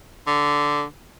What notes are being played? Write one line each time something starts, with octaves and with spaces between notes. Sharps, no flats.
D3